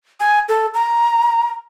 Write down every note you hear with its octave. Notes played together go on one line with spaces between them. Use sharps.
G#5
A4
A#5